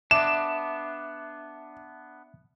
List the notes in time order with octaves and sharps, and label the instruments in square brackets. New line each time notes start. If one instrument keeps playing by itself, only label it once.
[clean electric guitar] B3 D4 [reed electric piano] E5 D6 [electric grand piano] E7